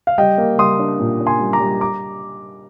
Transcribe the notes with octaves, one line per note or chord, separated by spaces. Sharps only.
F5
G3 D#5 G5
A#3
G3 C6 D#6
D4
A#2
D4
G#5 C6
G3
A#5 D6
G3
A#5 D6